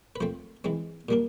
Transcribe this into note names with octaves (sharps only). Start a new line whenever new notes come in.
B4
F3 A3 C4 C5
E3 G#3 C4
A#2 G3 A#3 D4